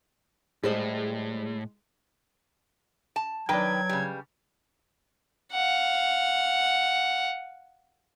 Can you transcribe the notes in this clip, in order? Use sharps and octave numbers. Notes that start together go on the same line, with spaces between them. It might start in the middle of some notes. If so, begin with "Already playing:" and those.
A2 G3 G#3 C5 D#5
A5
D#3 F#3 D4 B4 G5 G#6
C#3 G3
F5 F#5